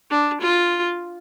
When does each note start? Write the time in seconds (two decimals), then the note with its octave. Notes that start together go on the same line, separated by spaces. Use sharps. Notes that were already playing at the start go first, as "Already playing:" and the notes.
0.11 D4
0.41 F4